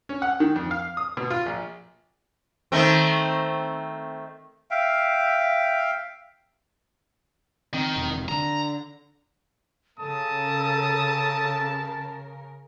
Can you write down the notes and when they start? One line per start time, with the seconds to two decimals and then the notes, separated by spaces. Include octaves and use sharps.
0.09 C#4
0.22 F#5
0.40 D#3
0.56 F2
0.71 F5
0.97 D#6
1.17 B2
1.30 F4
1.46 A#1
2.72 D#3 A3 C4
4.71 E5 F5 G5
7.74 D#3 C4
7.96 E1 F#2 C3
8.28 D3 A#5
9.99 C#3 A4 A#4 A5 D#6